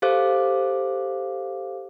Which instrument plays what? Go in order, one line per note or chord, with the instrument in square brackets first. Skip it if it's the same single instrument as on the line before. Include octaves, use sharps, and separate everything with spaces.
[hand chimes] G4 A4 C5 F5 D6 F#6